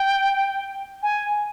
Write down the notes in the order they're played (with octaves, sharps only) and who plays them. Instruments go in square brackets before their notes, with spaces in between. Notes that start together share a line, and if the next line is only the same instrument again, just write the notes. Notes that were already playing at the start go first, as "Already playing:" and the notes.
Already playing: [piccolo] G5
G#5